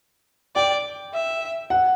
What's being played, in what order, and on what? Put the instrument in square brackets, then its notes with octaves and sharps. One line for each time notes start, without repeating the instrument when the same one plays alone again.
[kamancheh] D5 [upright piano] G5
[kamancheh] E5
[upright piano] F#5